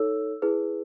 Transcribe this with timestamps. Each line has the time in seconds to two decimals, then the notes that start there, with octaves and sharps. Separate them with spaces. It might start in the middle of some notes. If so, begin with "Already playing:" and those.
Already playing: D#4 A4 C#5 E6
0.42 E4 G#4 B4